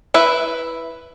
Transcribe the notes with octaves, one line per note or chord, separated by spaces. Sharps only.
E4 B4 E5